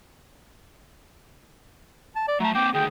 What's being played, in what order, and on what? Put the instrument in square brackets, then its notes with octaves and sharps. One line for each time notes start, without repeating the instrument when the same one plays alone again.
[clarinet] A5
D5
[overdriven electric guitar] F#3 A5 [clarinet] A3 [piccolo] A#5
[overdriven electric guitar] A#3 C4 [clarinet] G5 [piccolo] D6
[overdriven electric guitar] D2 D#3 [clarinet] G#4 [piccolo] G5